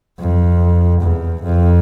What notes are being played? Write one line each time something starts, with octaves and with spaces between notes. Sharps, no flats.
F2
E2
F2